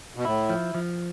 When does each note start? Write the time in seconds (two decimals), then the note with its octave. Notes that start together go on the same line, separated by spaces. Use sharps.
0.16 B2
0.25 A2 E4
0.49 F3
0.74 F3